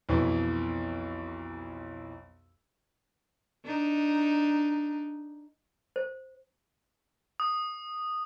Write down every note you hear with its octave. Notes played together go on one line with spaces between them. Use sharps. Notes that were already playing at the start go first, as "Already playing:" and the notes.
B1 F2 B2 E3
D4 D#4
C5
D#6